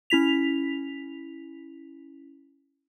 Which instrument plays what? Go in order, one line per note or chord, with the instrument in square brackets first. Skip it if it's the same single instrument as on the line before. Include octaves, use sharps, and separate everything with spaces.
[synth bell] C#4 E4 B6 F7